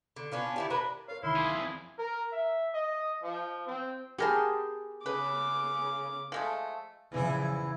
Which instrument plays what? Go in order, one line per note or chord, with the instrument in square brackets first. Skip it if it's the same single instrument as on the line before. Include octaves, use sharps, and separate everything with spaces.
[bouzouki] D3
B3 C#4 D4 F4
D#3 E4 G4
D4 A#4 B4
[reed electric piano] A#4 C#5 [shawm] F5
[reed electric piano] C2 D#3 B5 [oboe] E4 [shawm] C6
[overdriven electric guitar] A#3 G#4
[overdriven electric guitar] F2 G#4 [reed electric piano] E6
[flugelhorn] A#4
E5
D#5
F3
C4
[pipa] B3 A#4 A5 [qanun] G4 G#4 C6
[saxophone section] C#3 [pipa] B4 [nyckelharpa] D6
[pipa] F3 G#3 A3
[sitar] E2 E3 E4 [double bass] C#3 F3